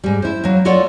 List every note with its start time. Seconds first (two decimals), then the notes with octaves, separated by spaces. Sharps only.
0.04 G#2 G3
0.22 E4 C5
0.44 F#3 A#3
0.65 A#3 F4 A4 C#5 D5 F#5